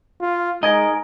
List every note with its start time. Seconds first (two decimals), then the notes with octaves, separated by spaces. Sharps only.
0.21 F4
0.63 G#3 D#4 G#4 A#4 D#5